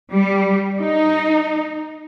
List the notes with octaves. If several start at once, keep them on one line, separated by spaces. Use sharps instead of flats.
G3
D#4